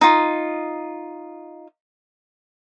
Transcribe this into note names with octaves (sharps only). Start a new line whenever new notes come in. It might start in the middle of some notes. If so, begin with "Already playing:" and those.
D#4 F4